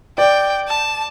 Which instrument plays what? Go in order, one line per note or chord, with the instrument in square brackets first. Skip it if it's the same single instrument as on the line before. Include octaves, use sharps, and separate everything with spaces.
[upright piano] D5 [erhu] G5
[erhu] A5